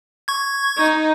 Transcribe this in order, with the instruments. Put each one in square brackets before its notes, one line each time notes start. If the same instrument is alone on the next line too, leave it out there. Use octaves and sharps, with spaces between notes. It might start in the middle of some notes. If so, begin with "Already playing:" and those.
[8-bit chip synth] C#6 G#6
[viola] D#4